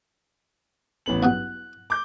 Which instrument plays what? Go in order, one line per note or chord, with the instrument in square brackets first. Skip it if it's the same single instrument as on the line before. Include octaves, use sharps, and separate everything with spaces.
[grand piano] A1 B3 F#7
[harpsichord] B1 G2 B3 [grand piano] F#6
[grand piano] D6 G6